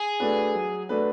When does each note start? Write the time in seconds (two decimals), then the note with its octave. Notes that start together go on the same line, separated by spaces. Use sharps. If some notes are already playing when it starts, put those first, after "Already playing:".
Already playing: G#4
0.20 A3 D4 F#4 B4
0.55 F#3
0.89 A3 D4 F#4 B4